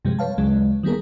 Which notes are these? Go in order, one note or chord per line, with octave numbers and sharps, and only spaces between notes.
G2 C3 F3 G3 G#3
B4 C#5 F5 A5
D2 C#3 F#3 G#3
D#3 G3 A#3 B3 G#4 A#4